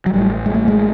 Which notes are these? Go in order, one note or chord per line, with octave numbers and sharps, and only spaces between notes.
F#3
A1 A2 G3
G#3
A3
G#3